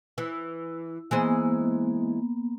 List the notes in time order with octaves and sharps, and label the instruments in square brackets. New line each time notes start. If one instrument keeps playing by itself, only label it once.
[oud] E3
[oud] E3 G#3 C5 [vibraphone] A#3 B3